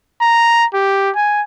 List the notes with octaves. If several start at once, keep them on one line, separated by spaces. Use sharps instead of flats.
A#5
G4
G#5